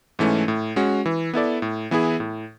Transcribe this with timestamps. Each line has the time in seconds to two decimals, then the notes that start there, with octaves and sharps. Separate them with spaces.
0.19 G#2 E3 A3 C#4
0.48 A2
0.76 G#3 C#4 F#4
1.06 E3
1.33 B3 E4 A4 D5
1.62 A2
1.91 E3 B3 E4 G#4
2.20 A2